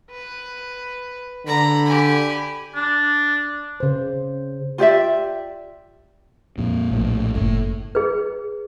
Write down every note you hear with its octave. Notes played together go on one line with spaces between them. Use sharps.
B4
D3 A#5 B5
G4 G#5
D4
C#3 C5
F4 G4 D5 E5
F2 A#2
A#1 A2
F#1 A2
G#4 B4